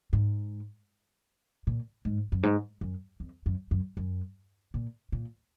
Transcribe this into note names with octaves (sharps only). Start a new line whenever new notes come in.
G#2
A#2
G#2
F#2
G#2
F#2
F2
F#2
F#2
F#2
A#2
A#2